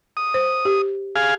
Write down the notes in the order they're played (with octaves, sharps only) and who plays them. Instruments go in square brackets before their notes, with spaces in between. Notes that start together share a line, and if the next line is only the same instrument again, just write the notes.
[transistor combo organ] D#6
[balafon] C5
G4
[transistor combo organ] G#4 F5